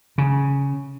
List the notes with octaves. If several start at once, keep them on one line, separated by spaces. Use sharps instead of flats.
C#3